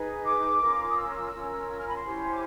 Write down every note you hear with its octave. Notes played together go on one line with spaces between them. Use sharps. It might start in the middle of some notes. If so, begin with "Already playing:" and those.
Already playing: D#4 G#4 B4
D6
C#4 F4 A#4
D#6
E6
C#4 F4 A#4
E6
F6
B5
C6
C#4 E4 G4 C5
D6